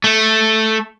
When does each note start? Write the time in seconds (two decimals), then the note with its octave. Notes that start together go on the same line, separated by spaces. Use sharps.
0.04 A3